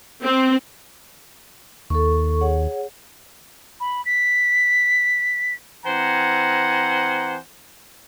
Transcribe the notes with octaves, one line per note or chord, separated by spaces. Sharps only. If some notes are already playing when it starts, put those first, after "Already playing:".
C4
D#2 A4 C#6
G#4 C#5 F#5
B5
B6
E3 C4 C5 F#5 G#5 A#5